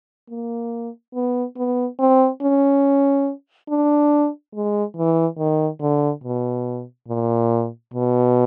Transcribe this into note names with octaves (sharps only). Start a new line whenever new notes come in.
A#3
B3
B3
C4
C#4
D4
G#3
E3
D#3
D3
B2
A#2
B2